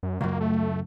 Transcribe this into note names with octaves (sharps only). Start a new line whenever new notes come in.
F#2
C#2 F#2 A#3
A3